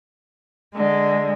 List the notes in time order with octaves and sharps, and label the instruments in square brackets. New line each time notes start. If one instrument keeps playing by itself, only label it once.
[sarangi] D3 [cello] G#3